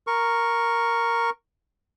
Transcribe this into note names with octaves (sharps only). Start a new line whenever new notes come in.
A#4 C#6